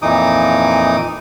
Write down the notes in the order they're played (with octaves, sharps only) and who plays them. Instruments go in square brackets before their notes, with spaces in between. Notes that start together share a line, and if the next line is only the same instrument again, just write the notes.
[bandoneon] F2 A#2 E3 D#4 D6 D#6